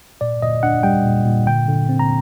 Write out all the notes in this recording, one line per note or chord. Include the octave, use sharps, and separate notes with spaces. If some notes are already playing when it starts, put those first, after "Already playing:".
A#2 D5
A#2 D#5
D4 F#5
G3 G5
A#2
A#2
D3 G5
D3
C4
A#5